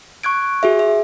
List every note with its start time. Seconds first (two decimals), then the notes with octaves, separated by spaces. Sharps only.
0.24 C#6 F#6 G#6 D7
0.63 F#4 G#4 E5
0.79 E5